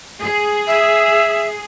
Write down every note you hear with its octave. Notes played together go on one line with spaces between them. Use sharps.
G#4
E5